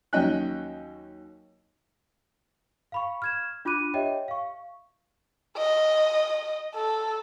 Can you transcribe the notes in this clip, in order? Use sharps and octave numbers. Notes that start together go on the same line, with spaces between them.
D#2 F#3 C#4 D#5 G5 F#6
F5 B5 C#6
F6 G#6 E7
D4 F4 B5 D6 F#6 D#7
G4 C#5 D#5 E5 G5
F5 C#6
D#5
A4